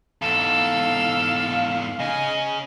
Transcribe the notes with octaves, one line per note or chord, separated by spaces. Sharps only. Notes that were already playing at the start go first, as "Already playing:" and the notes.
E2 G#2 A4 F5 E6
C#3 C#4 D#5 G#5